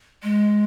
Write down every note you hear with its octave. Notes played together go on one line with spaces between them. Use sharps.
G#3